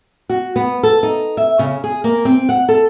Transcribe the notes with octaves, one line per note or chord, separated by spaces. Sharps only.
F#4
B3
A4
D#4
E5
C#3
G#4
A#3
C4
F#5
A4